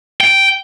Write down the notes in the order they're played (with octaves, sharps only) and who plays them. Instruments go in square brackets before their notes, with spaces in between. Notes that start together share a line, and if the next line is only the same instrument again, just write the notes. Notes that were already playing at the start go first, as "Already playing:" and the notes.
[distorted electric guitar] G5